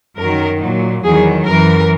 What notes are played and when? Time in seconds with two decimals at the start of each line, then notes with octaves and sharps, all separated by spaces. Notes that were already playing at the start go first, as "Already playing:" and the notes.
0.19 F#2 D#3 F#3 A#4
0.62 A#2 F#3
1.04 E2 D#3 F#3 G#4
1.46 F#2 E3 A#4